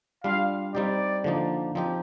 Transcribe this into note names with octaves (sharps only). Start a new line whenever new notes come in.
G3 D4 F4 F5
G3 C4 D#4 G4 D5
D3 F3 A#3 D#4
F3 C4 D#4 G4